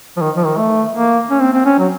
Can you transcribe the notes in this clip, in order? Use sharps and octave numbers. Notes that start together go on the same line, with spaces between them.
F3
D#3
F3
D#3
A3
A#3
C#4
C4
C4
C#4
F#3